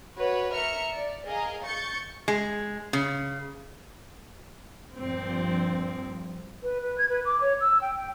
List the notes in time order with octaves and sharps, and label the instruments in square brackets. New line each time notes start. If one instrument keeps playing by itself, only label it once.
[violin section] F#4 B4 C#5
A#4 E5 F6 C#7
D5
G#4 A#4 D#5 F5
C#6 G6 A6 C#7
[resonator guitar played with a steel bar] G#3
C#3
[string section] G2 A#2 F3 C4
[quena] B4
B4
G#6
B4
D6
C#5
E6
G5
G5